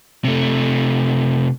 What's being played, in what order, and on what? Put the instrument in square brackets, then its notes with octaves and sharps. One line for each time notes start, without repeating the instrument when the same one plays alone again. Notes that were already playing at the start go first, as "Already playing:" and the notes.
[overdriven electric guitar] C3 A3